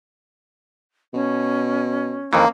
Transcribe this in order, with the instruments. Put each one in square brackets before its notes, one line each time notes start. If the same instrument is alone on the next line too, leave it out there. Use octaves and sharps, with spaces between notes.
[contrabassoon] B2 [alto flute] C#4
[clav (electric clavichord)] F2 D#3 E3 [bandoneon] A#3